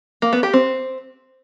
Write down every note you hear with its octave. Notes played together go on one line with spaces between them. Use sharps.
A#3
B3
G4
C4